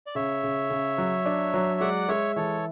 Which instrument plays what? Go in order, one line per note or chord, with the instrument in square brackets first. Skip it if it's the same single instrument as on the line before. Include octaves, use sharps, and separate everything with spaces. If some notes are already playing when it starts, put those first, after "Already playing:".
[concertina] D5
[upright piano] C#3 [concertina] C#5 E5
[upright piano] C#3
C#3
F#3
D4
F#3
[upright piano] G#3 [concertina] D5 F#5
[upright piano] G#3 [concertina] C#5 E5
[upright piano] E3 [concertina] A4 C#5